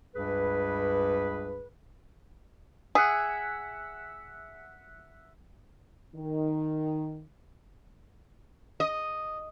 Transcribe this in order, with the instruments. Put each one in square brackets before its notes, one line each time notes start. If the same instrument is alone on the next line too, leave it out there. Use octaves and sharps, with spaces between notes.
[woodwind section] C#2 G2 G3 G#4 B4
[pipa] G#4 [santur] E5 F#5
[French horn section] D#3
[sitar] D#5